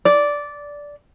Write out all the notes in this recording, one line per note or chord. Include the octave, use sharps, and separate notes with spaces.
D5